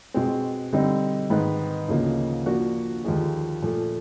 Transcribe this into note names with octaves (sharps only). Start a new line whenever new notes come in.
B2 G#3 C4
D3 G3 C4 D#4
G#2 D#3 G#3 B3 D#4
D2 C#3 F3 A#3 D#4
F3 A#3 D4 F#4
D#2 D3 F3 G#3
A#2 F3 A3